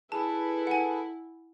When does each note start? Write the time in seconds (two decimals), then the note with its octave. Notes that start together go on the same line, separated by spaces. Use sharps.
0.12 E4 G#4 A4 B4 A5
0.67 F#5 G#5